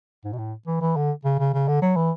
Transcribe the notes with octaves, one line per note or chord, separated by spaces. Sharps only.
G#2
B2
A2
E3
E3
D3
C#3
C#3
C#3
D3
F#3
E3